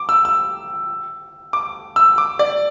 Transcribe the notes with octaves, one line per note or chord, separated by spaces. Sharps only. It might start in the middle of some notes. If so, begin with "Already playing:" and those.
Already playing: D6
E6
E6
D6
E6
D6
D5